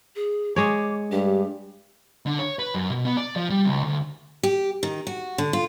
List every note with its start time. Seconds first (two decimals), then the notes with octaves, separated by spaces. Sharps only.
0.16 G#4
0.56 G#3 C#5 D6
1.12 G2 G4
2.26 D3
2.39 C#5
2.59 B4
2.75 F#2
2.91 B2
3.05 B3
3.17 D5
3.36 F3
3.50 G3
3.65 C#2
3.84 D2
4.43 G4
4.83 D#3
5.07 F#4
5.38 D3
5.53 F4